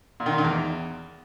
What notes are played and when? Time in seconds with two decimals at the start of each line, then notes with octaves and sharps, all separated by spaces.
0.20 A#2
0.26 D#3
0.32 A#2
0.38 D#3
0.44 E2